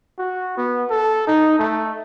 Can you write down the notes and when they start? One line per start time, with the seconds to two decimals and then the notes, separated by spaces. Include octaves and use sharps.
0.19 F#4
0.57 B3
0.90 A4
1.28 D#4
1.59 A3